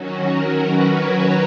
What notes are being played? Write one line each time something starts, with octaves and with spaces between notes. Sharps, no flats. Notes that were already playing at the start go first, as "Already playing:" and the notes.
Already playing: D#3 F#3 C#4 F#4
A#4
B4
C#5